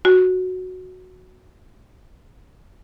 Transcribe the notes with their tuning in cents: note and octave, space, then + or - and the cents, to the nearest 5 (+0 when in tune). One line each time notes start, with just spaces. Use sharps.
F#4 -5